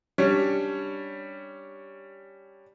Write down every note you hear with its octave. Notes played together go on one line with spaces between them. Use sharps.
G3 C#4 D4 C#5